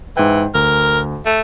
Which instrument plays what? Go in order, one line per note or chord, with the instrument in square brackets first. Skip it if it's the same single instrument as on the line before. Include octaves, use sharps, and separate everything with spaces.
[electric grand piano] G#2 G5 [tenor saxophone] E3
[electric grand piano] D2 [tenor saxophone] A#4
[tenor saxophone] A3